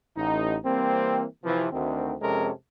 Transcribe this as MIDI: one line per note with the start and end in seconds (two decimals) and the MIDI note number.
0.16 0.56 33
0.16 0.56 63
0.65 1.25 52
0.65 1.25 55
0.65 1.25 58
0.65 1.25 60
1.44 1.69 48
1.44 1.69 52
1.44 1.69 53
1.72 2.14 38
1.72 2.14 51
1.72 2.14 60
2.21 2.50 41
2.21 2.50 48
2.21 2.50 56
2.21 2.50 61
2.21 2.50 69
2.21 2.50 70